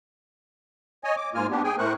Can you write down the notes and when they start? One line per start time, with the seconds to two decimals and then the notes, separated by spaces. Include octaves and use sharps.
1.04 C#5 D#5 G#5
1.17 D6
1.35 G#2 A#3 F4 G#5 F6
1.51 B3 D4 G4
1.64 G#4 G5 G#5
1.79 A2 A3 A#4 C5 C#6 F#6